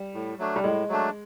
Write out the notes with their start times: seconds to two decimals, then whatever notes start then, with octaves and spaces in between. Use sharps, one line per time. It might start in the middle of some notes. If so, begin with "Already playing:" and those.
Already playing: G3
0.14 A2
0.39 F#3 A3 D4
0.56 G3
0.64 A2 G#3
0.89 F#3 A3 D4